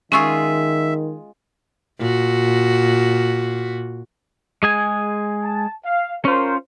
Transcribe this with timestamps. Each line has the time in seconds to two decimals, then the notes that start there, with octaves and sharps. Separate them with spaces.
0.12 D#3 G#3 C#4 F4 G#4 E5 C#6 E6
1.99 A#2 F#4
4.63 G#3 G#4 G#5
5.43 A5
5.85 F5
6.25 C#4 F4 A#4 C5